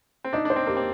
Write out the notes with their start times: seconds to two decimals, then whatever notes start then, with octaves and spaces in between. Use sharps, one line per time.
0.25 C4
0.33 D4 D#4
0.45 D4 C5
0.56 C4
0.67 A#3 G4
0.77 C4